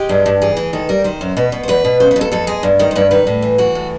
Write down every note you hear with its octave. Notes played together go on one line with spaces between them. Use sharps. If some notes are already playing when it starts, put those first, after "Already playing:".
Already playing: G#3 G4
G2
G2
E3 G#4
E3
D#3 A4
G3 A#4
D#3 C5
F#2
B2 B4
B2
C5
E2 B4
B2
C#3 C5
B4
F2
A4
F2 A4
G#3 G#4
G2
D#3 A#4
C5
G2 B4
D#3 B4
A2
E3
E3 F#4
A2